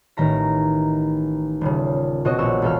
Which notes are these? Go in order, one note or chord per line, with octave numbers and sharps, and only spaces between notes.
A1 D#3 A#5 B6
D#1 C#3
B2 C4 F#4 C#5 D#5
A#1 C#6 E6
E1 B2 A4 F5 F6